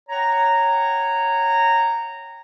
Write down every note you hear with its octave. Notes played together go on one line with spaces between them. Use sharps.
C#5 F#5 G5 A#5